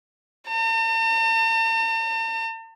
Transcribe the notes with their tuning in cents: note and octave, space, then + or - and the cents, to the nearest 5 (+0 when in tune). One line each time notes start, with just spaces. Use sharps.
A5 +45